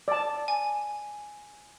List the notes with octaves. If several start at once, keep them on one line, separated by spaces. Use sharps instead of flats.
D5 A5
G#5